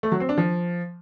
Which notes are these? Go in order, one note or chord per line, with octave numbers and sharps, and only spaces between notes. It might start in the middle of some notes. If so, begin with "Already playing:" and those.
A3
F#3
C4
D4
F3